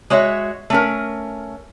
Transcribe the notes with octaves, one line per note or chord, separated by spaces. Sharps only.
G#3 F#4 C#5 E5
A3 C#4 A#4